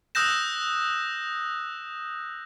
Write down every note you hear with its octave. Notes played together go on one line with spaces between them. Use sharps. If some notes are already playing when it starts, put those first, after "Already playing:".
D#6 E6 F#6 G6 A#6 E7